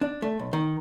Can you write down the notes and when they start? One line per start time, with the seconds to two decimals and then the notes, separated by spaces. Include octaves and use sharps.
0.01 D4
0.22 A3
0.39 B1
0.53 D#3